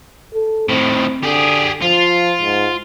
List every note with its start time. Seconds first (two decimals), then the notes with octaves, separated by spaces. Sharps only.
0.34 A4
0.69 A2 D#3 C4
1.23 D3 G4 G#4
1.82 F3 F4
2.41 G#2